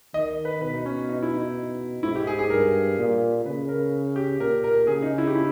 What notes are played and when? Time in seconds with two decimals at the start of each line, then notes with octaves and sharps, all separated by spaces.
0.14 D#3 D#5
0.45 B4
0.61 B2 B4
0.74 D#4
0.86 C#4
1.09 D#4
1.23 E4
1.36 D#4
2.03 G#2 E4
2.16 G4
2.27 G#4
2.39 G#4
2.50 G2 A#4
2.98 A#2
3.46 C#3 B4
3.69 A#4
4.16 G4
4.40 A#2 A#4
4.64 A#4
4.87 C#3 G#4
5.02 D#4
5.18 E4
5.28 G4
5.35 E4